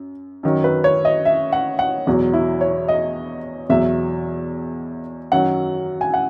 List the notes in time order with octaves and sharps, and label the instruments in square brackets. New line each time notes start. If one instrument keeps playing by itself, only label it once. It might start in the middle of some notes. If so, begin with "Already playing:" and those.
Already playing: [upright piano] F#2
F#2 D#3 F#3
B4
C#5
D#5
E5
F#5
F#5
E2 B2 F#3
E4
C#5
D#5
E2 B2 F#3 E5
F#2 D#3 F#3 F#5
G#5
F#5